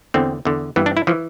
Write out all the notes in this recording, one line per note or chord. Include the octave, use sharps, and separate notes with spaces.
E2 D3 C4
E2 D3
G2 E3 B3
D4
E4
E3 F3